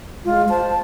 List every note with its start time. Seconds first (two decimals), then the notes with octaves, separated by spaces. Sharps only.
0.25 G#3 F4
0.50 C5 A5